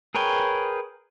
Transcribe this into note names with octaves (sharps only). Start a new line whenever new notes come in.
G#4 A#4 B4 C#5 G5